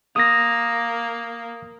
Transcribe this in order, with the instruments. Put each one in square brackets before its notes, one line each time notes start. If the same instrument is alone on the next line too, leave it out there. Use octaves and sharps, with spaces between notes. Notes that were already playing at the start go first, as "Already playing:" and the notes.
[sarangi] A#3 [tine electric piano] D#6 A#6